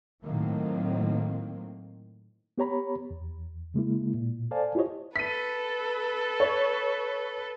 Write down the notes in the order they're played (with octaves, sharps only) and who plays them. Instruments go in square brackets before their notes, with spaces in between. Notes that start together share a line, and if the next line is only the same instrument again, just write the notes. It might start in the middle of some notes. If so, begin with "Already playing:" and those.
[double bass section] A2 D#3 F#3 A#3 C4
[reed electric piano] B3 G4 C#5 A#5 B5
E2
C#3 G#3 A#3 E4
A#2
A4 C5 D5 F5 G#5 A5
E4 F4 G4 C5 C#5 D#5
[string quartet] A4 B4 [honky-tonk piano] B6 D#7
[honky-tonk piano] C#5